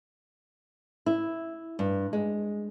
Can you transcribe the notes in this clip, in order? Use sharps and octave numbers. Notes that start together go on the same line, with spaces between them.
E4
G2
G#3